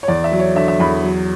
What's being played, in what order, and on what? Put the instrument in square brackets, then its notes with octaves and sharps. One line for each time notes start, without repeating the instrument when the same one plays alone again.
[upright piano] C#5
E2 D5
E5
F#3
C#5
D3 E5
E5
E2 B5
F#3